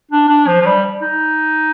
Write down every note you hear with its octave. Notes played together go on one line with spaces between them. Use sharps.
D4
D4
F3
F3
G3
D#4